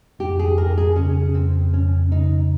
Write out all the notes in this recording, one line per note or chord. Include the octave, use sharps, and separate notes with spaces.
F2 G4
G#4
F2 A#4
G#4
C#3 C#4
F2 C4
F2 C#4
C#3 D#4